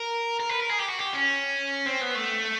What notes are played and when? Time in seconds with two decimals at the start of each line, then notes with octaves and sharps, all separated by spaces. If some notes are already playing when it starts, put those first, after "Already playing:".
Already playing: A#4
0.40 A#4
0.50 B4
0.61 A#4
0.70 G#4
0.80 G4
0.89 F#4
0.99 G4
1.14 C#4
1.86 C4
2.02 B3
2.15 A3